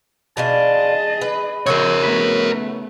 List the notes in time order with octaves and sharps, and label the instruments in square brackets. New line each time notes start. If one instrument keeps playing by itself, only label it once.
[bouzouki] B2 D4 F4 [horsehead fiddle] G#4 D#5 [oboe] A5
[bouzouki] B4
[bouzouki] C#3 D#4 F#4 [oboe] C4 [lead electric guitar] A#4 C#5
[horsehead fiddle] A3 B3 [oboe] B5